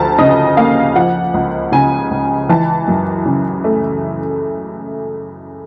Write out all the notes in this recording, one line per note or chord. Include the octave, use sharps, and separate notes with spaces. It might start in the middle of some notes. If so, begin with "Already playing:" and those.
Already playing: D2 F3 A5 A#5
C#3 D#5
A#3 F5
F3 F#5
C#2
C#3 G#5
C#2
E3 A5
F#2
C#3
A3